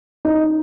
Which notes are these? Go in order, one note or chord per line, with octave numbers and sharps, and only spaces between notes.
D#4